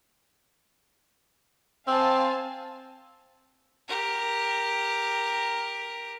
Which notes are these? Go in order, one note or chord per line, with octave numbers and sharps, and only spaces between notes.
C4 F5 G#5 A5
G4 A#4